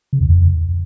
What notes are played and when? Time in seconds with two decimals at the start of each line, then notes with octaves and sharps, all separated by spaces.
0.13 C#3
0.21 E2
0.29 F2